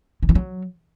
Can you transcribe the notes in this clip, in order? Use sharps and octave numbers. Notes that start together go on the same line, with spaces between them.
D3
E3
F#3